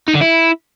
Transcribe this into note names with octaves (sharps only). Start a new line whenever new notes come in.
D#4
D3
E4